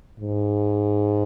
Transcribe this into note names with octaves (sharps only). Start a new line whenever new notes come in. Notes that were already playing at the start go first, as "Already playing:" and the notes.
G#2